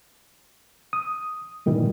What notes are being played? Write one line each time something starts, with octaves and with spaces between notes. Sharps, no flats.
D#6
G2 A#2 D#3 E3 G3